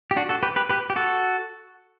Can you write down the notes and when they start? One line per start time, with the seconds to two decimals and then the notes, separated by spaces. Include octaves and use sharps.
0.11 G4
0.16 D4 F#4
0.29 F#4 A4
0.43 G4 B4
0.56 G4 B4
0.69 G4 B4
0.90 G4
0.96 F#4 A4